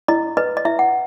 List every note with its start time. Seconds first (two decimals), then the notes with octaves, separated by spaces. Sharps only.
0.08 E4 D#5
0.37 B4 D#5
0.57 D#5
0.65 E4 E5
0.79 F#5